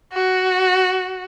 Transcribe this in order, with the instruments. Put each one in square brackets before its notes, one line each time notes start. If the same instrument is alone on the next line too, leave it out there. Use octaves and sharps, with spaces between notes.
[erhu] F#4